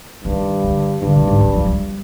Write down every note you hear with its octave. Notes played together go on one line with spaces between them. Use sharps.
G2 D#3
D3
G2 D3
A#2
G#2
G3
F3
G3